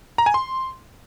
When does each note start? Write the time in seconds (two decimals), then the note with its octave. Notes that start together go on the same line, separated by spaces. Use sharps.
0.18 A#5
0.26 G#5
0.34 C6